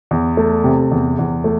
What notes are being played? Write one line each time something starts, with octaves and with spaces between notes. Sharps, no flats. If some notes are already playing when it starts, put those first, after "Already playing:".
E2
A3
C3
E2
E2
A3